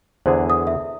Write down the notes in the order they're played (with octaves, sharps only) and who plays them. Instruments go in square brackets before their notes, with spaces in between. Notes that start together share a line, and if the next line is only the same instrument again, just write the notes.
[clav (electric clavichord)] E2 D3 G#4 [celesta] C5
[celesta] D#6
E5